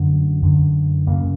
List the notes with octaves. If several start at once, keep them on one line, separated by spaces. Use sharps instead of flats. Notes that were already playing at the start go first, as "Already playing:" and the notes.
Already playing: F#2 D3 A3
F#2 D3
F#2 C#3 A#3